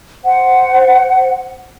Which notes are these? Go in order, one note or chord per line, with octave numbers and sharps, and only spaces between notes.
C5 F#5